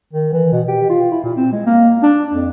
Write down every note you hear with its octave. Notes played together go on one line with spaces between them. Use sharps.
D#3
E3
B2
G4
F4
E4
A#2
C4
G#3
A#3
D4
F2